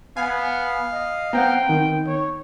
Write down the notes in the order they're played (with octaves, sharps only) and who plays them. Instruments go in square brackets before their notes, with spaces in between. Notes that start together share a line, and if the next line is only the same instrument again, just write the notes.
[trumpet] B3 [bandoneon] F5 [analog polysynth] G#5
[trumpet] D#5
[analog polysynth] B3 C4 [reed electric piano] F#5 A#5 [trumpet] G5
[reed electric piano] D#3
[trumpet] C#5